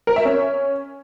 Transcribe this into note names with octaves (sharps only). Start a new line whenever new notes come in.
A#4
E5
C#4